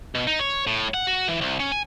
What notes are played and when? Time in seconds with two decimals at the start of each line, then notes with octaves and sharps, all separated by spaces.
0.15 B2
0.27 D#4
0.39 C#5
0.67 A2
0.94 F#5
1.07 F#4
1.28 E3
1.41 C2
1.60 C#4
1.72 G#5